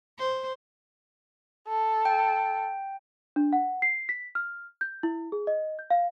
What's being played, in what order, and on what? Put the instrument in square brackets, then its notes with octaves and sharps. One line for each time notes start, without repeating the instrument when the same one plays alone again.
[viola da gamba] C5
[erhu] A4
[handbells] G5
[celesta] D4
F#5
C7
B6
F6
G6
E4
G#4
D#5
G6
F5